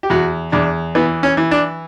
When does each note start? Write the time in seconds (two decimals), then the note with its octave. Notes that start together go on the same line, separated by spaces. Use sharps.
0.03 G4
0.10 E2 F#4
0.52 E2 D4
0.95 E3 B3
1.23 C#4
1.37 E3
1.51 D4